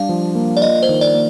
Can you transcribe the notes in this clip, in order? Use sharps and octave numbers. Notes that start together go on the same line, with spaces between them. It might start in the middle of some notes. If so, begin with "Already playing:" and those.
Already playing: G3 D4 F5
F3
A#3
D5
F4 D#5
C5
D#3
D5
A#3